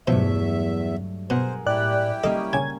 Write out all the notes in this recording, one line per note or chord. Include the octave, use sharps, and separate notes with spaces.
E2 G2 B2 F3 F#3 A3 E5
B2 G#4 A#4 C5 F#5
A2 E4 G4 D5 G5 F#6
G3 A#3 C#4 A4 D#5
C#3 G#5 G#6